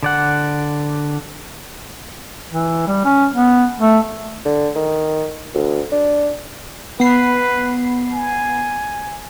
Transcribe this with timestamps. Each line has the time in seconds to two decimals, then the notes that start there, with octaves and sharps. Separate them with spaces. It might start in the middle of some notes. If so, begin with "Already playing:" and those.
0.03 D3 D5 F#5
2.52 E3
2.87 G3
3.05 C#4
3.34 B3
3.80 A3
4.45 D3
4.75 D#3
5.54 D2
5.92 D4
7.00 B3 B4 C7
8.12 G#5